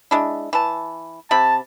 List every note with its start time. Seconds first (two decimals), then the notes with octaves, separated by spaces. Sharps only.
0.11 G#3 D4 E4
0.53 E3 A5
1.31 C3 A5 B5